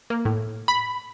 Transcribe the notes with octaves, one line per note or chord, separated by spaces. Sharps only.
A#3
A2
B5